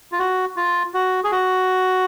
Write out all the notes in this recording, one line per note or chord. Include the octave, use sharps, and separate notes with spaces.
F4
F#4
F4
F#4
G#4
F#4